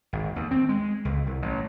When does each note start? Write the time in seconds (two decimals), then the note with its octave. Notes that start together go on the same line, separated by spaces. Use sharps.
0.13 G#1
0.36 D#2
0.51 C4
0.69 G#3
1.05 C#2
1.27 C2
1.42 A1